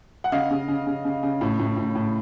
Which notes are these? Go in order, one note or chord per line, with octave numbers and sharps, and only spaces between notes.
F#5
C#3 D#5 F5
C#3
C#3
C#3
C#3
C#3
A2
A2
A2
A2